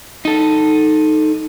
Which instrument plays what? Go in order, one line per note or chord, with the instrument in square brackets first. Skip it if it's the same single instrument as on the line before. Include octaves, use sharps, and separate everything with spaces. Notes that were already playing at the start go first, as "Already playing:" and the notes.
[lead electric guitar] D#4 A4